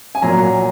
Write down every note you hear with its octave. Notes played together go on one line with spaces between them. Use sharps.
G#5
A#2 F#3 A#5